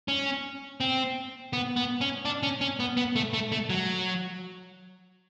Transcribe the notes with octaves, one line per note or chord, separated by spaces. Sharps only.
C#4
C4
B3
B3
C#4
D4
C#4
C#4
B3
B3
A3
A3
A3
F#3